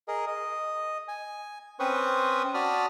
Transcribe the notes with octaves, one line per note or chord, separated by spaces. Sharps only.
G#4 A#4 D#5
D#5
G#5
C4 C#4 B4 C5 C#6 D#6
F#4 D5 A5 B5 D#6 F6